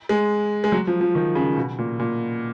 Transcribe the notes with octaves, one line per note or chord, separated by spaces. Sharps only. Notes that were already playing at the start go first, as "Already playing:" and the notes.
G#3
G#3
F#3
F3
F3
D#3
C#3
B2
A#2
A#2